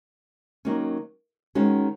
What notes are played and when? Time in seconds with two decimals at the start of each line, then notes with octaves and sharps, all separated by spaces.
0.65 D#3 F#3 A#3 C#4
1.55 D#3 G#3 C#4 F#4